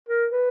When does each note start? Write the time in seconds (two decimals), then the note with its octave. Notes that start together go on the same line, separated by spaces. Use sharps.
0.09 A#4
0.33 B4